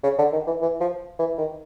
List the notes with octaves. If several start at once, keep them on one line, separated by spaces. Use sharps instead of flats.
C#3
D3
D#3
E3
E3
F3
E3
D#3